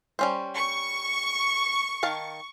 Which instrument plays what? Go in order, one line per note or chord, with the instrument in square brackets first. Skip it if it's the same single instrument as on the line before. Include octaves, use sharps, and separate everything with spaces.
[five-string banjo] G3 C#4 C5
[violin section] C#6
[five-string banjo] D#3 F5 A5